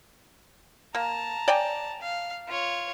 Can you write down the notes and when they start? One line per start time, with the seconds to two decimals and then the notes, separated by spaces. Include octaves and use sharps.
0.95 A#3 A5 A#5
1.48 D5 G5 G#5
2.02 F5
2.47 F4 C#5